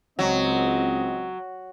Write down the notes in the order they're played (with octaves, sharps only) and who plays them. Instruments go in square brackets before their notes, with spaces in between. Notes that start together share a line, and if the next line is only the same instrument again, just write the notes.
[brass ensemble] C#2 C4 D#5 [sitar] F#3